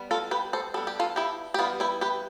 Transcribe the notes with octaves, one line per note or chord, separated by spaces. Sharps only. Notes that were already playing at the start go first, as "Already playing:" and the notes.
Already playing: G3 B3
F4 A4
G4 B4
A4 C5
G3 B3 D4 A4
G4
F4 A4
E4 G4
G4
E3 G3 B3 F4
E4 G4
G4 B4